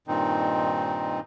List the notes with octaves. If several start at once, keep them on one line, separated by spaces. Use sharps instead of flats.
G2 A#2 D#3 C4 D#4